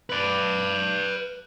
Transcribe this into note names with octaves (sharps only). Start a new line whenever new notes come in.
B4 D5